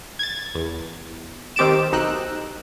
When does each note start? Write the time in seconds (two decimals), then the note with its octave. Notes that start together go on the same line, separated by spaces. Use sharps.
0.19 G#6 A6
0.55 E2
1.56 D#3 C4 G4 A6 D7 E7
1.92 B1 D#4 E6 F#6 G6